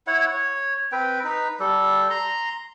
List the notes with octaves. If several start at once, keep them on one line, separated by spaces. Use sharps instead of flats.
E4 C#5 F#5
C#5
C4 B4 G5
D#4 B4
G3 A4
A#5 C6